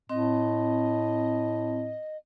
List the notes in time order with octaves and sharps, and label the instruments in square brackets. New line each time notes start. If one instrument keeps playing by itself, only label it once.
[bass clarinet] A2 [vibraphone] C4 [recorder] D#5